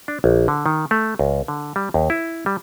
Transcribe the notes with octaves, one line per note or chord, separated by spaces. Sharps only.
D4
A#1
D3
D#3
A3
C#2
D3
G3
D#2
E4
G3